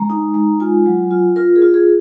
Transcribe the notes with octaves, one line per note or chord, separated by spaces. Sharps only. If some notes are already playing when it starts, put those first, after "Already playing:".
Already playing: G#3 A#5
D#4
G#3
F4 G#5
F#3
F4
F4 A#4
G#4
F4
G#4